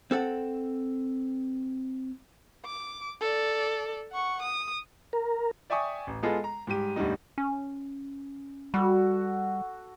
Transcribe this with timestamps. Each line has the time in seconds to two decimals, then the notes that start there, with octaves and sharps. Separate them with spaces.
0.11 C4 A4 F#5
2.66 D6
3.21 A4 D5
4.12 F#5 C#6
4.42 D#6
5.13 A#4
5.70 D5 E5 G5 G#5 C#6 D#6
6.07 A1
6.23 G#3 B3 F4 G#4 A4 D#5
6.44 A#5
6.67 G#2 G3 G4 D#7
6.96 E2 A2 D3 G3 D#4
7.38 C#4
8.74 G3 F#4 A4